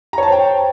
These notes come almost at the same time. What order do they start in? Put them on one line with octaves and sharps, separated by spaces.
A#5 C#5 A5 C5 G5